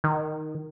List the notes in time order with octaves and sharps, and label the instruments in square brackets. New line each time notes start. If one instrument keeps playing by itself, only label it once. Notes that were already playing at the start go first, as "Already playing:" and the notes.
[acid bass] D#3